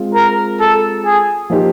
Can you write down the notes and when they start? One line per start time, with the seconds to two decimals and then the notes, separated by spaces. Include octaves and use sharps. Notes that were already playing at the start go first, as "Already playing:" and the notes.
Already playing: G#3 C4 F4
0.15 A#4
0.60 A4
1.05 G#4
1.50 F3 A#3 D#4 G4 C5